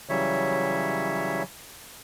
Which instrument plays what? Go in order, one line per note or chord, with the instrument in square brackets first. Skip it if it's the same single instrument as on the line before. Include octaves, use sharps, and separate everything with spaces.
[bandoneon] C#3 E3 F#3 G3 C#5 E5